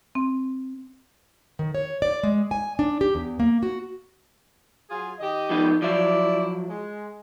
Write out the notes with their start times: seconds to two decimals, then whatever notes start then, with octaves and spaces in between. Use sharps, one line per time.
0.15 C4
1.59 D#3
1.75 C#5
2.02 D5
2.23 G#3
2.51 G#5
2.79 D4
3.01 G4
3.15 E2
3.40 A#3
3.63 F#4
4.90 F#3 F4 G#4
5.20 D#3 G4 D#5
5.50 F3 B3 D#4
5.82 F3 F#3 E4 D5
6.68 G#3